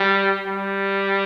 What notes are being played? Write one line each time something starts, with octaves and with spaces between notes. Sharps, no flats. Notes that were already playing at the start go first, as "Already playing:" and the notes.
Already playing: G3
G3